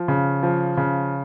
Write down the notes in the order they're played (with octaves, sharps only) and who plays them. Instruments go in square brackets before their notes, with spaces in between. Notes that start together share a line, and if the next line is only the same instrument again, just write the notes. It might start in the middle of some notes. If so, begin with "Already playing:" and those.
Already playing: [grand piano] F3
C#3
F3
C#3